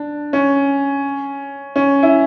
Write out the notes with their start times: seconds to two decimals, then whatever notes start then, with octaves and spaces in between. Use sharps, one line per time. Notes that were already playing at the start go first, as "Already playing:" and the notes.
Already playing: D4
0.33 C#4
1.76 C#4
2.03 E4